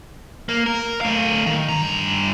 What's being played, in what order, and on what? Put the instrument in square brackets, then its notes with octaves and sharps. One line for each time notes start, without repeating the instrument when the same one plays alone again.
[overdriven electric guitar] A#3
A#4
A3 F5
D#3
G2 A#5